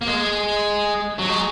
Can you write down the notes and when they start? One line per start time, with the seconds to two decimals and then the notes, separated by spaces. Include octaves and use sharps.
0.01 A#3
0.07 G#3
1.19 F#3
1.29 G#3